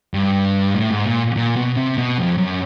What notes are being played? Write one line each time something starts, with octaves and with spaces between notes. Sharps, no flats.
G2
A2
G#2
A#2
A#2
B2
C3
B2
F2
F#2